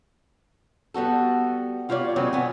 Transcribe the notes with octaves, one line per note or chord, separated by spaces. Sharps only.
G3 B3 F#4 A4
G3 F4 G4 C#5 D5
C#3 F#3 G#3 B3 C4
B2 B3 G#5